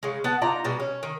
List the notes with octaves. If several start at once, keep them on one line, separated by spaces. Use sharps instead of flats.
C#3 G#3
B3 F#5 A5
D#4 F4 D5 A#5
B2 G3 G#3
C#4
D#3